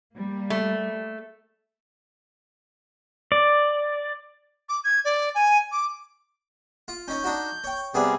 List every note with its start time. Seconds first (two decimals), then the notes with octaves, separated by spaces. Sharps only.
0.15 G3 A#3
0.50 A3
3.32 D5
4.69 D6
4.84 G#6
5.05 D5
5.35 G#5
5.72 D6
6.88 F4
7.08 C#4 D#4 C#5 G6
7.24 D4 D#4 F#4
7.64 C#5 G5
7.94 C3 G3 B3 C4 D4 G#4